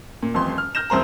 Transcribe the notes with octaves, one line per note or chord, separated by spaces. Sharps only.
A#2
D#1 A1 F2 C6
F6
F6 G6 A#6 E7
E1 C2 C5 A#5